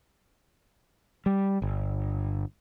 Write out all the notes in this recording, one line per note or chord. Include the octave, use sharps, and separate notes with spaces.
G3
G1